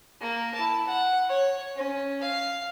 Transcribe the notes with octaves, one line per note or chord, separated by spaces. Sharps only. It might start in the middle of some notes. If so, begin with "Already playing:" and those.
A#3
E4 A5
F#5
C#5
C#4
F5